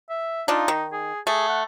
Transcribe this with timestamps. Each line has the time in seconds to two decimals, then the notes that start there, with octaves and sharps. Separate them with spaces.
0.09 E5
0.48 D4 D#4 F4
0.68 D#3
0.92 G#4
1.27 A3 G#4
1.48 F#5